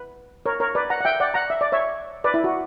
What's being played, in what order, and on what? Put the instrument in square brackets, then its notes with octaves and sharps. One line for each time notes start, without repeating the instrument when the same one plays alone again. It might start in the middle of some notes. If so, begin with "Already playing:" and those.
Already playing: [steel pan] B4
A#4 C#5
A#4 C#5
B4 D5
F#5 A#5
F#5
E5 G5
D5 F#5
F#5 A#5
E5
D5
C#5 E5
B4 D5
E4
F#4